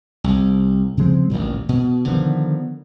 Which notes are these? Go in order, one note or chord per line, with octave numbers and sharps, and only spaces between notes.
C2
C#3 F3 G#3 C4
A1 D2 A#2 F#3
B2
D3 D#3 F3 B3